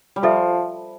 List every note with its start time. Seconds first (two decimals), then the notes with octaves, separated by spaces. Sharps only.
0.16 G3
0.23 F3 F4 A4 E5